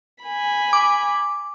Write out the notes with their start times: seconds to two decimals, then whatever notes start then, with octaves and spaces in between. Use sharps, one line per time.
0.24 G#5 B5
0.73 D6